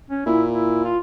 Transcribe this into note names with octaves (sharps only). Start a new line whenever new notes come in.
C#4
A#2 E4
E4
F4